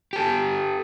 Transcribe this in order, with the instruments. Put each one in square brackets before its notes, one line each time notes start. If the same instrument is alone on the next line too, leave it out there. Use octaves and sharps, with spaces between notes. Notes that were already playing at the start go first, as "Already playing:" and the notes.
[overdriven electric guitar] G4 A4